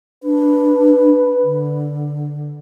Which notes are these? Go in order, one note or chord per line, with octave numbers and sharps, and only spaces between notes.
D4 B4
D3